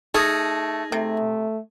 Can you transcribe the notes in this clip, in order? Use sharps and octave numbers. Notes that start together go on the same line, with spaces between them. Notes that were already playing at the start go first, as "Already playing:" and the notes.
A3 D#4 G#4 D#6 A#6
C3 A3